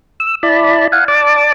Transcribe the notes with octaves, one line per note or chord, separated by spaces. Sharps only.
E6
E4 D5 A5 B5
F5 F#5 G#5
D5 A5 D6